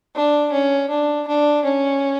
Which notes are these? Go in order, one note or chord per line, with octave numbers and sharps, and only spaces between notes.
D4
C#4
D4
D4
C#4